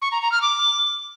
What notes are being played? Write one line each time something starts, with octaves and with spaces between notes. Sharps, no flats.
C#6
A#5
A#5
F6
D6